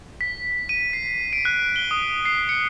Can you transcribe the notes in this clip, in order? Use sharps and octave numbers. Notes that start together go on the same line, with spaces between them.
B6
D#7
C7
D7
F#6
G7
D#6
C7
C#7